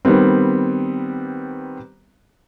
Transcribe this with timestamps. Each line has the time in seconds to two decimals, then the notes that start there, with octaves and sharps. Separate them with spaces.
0.05 D#3 G3 B3 C4